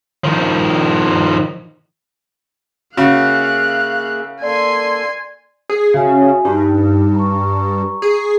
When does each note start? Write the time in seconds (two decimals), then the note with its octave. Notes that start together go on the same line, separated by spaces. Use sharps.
0.24 D#3 F3
2.97 C#3 A#3 F#4 G#4 E5 F5 F#6
4.42 A#3 A4 D5 G#5 C6
5.70 G#4
5.94 C#3 F#4 E5 G#5
6.45 G2 D#4 G4
7.15 A#5 C#6
8.02 G#4